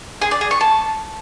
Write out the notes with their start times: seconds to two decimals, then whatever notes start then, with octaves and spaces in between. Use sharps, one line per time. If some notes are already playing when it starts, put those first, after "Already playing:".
0.22 G#4
0.31 D5
0.41 G#4
0.51 C#6
0.61 A5